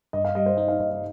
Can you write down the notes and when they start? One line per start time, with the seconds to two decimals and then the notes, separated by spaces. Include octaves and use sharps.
0.13 G2 D#5
0.25 F5
0.35 G3 D#5
0.46 C5
0.57 D#4 D#5
0.68 F5
0.79 G2 D#5
0.90 D#5